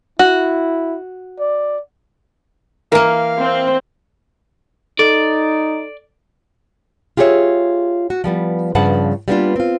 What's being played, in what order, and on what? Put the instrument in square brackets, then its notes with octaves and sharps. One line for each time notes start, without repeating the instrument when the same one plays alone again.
[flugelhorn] E4 [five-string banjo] F#4
[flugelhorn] D5
[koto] E3 A#3 [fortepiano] A#4 [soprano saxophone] F5
[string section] C4
[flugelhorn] D#4 [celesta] A4 [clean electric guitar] D5
[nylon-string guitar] F4 G4 G#4 A#4 C#5 E5
F#4
F3 G3 B3
G2 C#3 F3 B4 F#5 A5
G3 A#3 B3 C#4 D4 F4
C4 F4